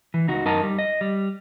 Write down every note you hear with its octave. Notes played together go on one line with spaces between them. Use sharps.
E3
C#2 D#4 F#4
F#2 D#4 A#4 D#5 A5
G3
D#5
G3